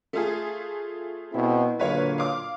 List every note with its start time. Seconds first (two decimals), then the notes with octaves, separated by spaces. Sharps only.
0.13 A3 F4 G#4
1.32 B2 C4 E4
1.79 A#2 D3 F#3 B4 C#5 F5
2.18 F5 D6